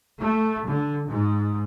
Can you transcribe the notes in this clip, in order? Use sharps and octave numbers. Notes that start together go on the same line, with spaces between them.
A3
D3
G#2